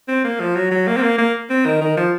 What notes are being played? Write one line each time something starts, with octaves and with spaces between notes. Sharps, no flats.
C4
A#3
F3
F#3
F#3
A#3
C4
A#3
A#3
C4
D#3
D#3
F3